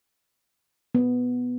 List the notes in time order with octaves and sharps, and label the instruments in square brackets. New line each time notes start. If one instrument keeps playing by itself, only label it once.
[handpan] B3